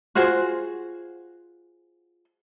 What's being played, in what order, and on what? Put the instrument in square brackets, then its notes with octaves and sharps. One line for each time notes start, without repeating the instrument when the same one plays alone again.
[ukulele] F4 F#4 G#4 C5